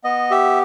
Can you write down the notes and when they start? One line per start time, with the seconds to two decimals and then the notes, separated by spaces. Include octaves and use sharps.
0.04 B3 D#5
0.31 G4 E5